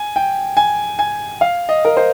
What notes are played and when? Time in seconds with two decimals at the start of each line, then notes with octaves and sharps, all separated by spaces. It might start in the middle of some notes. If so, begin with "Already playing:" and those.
Already playing: G#5
0.16 G5
0.57 G#5
0.99 G#5
1.41 F5
1.69 D#5
1.85 A#4
1.97 C5